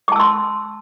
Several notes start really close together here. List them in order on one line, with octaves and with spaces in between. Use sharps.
D6 A5 E6 C6